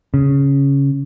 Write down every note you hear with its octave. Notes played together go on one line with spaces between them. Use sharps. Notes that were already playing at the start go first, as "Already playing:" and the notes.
C#3